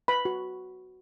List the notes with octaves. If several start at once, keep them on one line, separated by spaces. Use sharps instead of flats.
B4 B5
F#4